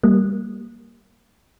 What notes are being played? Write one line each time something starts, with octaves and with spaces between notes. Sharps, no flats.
G3 A#3